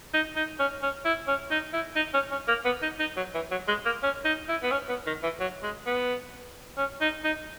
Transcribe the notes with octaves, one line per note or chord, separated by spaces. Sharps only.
D#4
D#4
C#4
C#4
E4
C#4
D#4
E4
D#4
C#4
C#4
A#3
B3
D#4
D#4
F#3
E3
F#3
G#3
A#3
C#4
D#4
E4
B3
C#4
B3
D#3
E3
F#3
G#3
B3
C#4
D#4
D#4